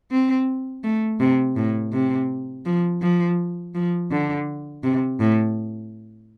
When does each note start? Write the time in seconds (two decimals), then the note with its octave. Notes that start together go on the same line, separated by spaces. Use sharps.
0.11 C4
0.84 A3
1.20 C3
1.56 A2
1.93 C3
2.66 F3
3.02 F3
3.75 F3
4.11 D3
4.84 C3
5.20 A2